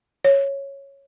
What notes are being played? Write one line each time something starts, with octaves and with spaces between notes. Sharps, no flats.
C#5